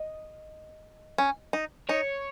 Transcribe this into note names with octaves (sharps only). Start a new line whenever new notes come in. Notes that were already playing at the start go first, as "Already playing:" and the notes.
Already playing: D#5
C#4
D#4
D#4 C#5